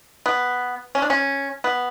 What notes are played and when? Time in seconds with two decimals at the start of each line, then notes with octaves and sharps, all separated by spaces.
0.26 B3
0.95 C#4
1.02 D4
1.10 C#4
1.64 B3